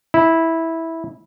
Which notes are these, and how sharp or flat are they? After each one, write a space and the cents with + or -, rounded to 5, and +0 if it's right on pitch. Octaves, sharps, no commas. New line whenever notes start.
E4 -10